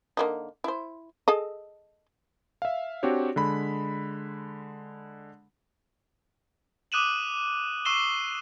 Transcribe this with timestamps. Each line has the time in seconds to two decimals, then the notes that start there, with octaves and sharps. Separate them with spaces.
0.17 D3 A#3 D#4
0.64 E4 C5
1.28 G#4 A4 D#5
2.62 E5 F5
3.03 C4 D4 F#4 G4 C#5
3.36 D3 G#3 B5 B6
6.92 D6 D#6 F#6 D#7 E7 F#7
7.85 C#6 E6 C7 E7 G7